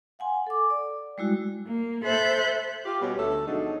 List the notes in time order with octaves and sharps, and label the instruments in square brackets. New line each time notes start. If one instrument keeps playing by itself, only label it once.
[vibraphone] F5 F#5 G#5 C6
A4 D6
D5
G3 G#3 E4 F#4
[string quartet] A#3
A4 C5 E5 B5 F#6 G6
[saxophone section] F4 G4
B2 G3 C#4
D2 A3 A4
B2 F3 F#3 G#3 D4 D#4